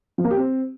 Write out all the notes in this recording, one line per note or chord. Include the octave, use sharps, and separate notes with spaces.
F3
A#3
G4
C4